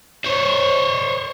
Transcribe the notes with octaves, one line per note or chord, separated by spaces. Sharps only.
C5 C#5